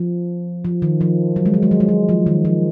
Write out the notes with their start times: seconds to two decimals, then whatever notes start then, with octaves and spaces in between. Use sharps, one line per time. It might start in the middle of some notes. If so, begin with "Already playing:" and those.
Already playing: F3
0.65 F3
0.82 D#3
1.01 F3
1.36 F#3
1.46 G#3
1.54 F#3
1.63 G#3
1.71 F#3
1.80 G#3
1.89 F#3
2.09 F3
2.27 D#3
2.45 F3